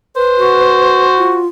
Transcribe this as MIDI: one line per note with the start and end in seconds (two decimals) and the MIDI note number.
0.16 1.06 71
0.16 1.40 72
0.39 1.42 66
1.18 1.47 65